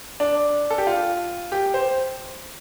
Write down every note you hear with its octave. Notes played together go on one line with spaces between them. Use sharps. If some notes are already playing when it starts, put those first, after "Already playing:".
D4
A4
G4
F4
G4
C5